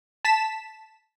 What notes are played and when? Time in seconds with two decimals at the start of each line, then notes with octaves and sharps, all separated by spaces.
0.25 A5 B6 E7